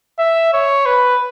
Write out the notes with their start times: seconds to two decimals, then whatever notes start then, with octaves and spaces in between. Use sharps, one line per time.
0.19 E5
0.53 C#5
0.86 B4